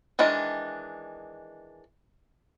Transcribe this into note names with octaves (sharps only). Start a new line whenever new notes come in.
D#3 E3 G#3 D4